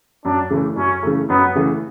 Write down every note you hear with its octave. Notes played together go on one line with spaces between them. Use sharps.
F#2 D4
C#3 E3 A3
F#2 C#4
C#3 E3 A3
F#2 B3
C#3 E3 A3